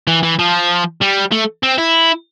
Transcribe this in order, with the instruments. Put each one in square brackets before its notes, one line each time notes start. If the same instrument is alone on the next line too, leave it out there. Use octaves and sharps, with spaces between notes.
[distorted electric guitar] E3
E3
F3
G3
A3
C4
E4